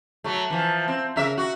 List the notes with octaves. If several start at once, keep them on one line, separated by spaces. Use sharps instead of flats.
F#3 A3
E3 F3
C4
C#3 A#4 E5
F#4